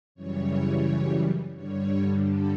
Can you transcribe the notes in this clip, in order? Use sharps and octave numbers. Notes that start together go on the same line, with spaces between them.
F#2 C#3 E3 G3 C#5
G2 D3 G3 C#5
A4